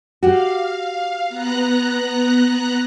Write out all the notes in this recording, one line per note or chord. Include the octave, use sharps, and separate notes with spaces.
F#4 G4 F5
B3 A#5 F#6